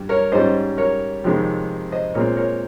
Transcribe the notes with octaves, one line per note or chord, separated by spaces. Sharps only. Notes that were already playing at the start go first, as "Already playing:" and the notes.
Already playing: G2 G3
A#4 C#5
G#2 G3 C#4 C5 D#5
A#4 C#5
F2 C3 D#3 G#3 C4
C5 D#5
A#2 G#3 C4 A#4 C#5
A#4 C#5